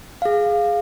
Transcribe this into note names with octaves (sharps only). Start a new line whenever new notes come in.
G#4 F5